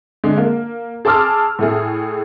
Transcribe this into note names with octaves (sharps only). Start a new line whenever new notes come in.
D3 G#3
A#3
G#4 A5 C6 D6 E6 F6
A2 A3 G#4